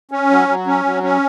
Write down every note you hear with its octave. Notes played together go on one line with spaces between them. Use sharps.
C#4
F#3
F#3
C#4
F#3
C#4